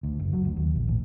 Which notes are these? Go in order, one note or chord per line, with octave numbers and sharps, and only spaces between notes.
D2
F#1
F#3
D2
D#2
A#1
A1